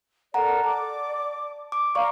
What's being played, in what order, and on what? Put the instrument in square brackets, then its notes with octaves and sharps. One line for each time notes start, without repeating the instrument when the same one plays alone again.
[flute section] A4 A#4 D5 [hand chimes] F#5 A#5
[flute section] D5 D6 [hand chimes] A5
[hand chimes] D6
[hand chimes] D5 C#6 [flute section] F5 A#5